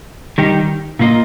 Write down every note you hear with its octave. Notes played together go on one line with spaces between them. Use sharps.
D#3 G3 D#4 G4
A#2 A#3 F4 D#5